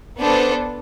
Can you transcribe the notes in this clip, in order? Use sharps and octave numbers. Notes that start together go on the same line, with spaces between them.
B3 D4 A4 C5